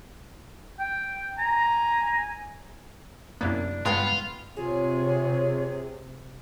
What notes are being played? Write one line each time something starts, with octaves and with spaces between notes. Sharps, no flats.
G5
G#5 A#5
F#2 C3 A#3 B3 D4 E4
G2 G#3 B3 D4 F4 G5 G#6 C7
C3 F4 G#4 C#5